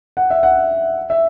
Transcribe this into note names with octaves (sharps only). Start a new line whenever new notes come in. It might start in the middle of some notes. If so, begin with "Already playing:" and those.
F#5
E5
F#5
E5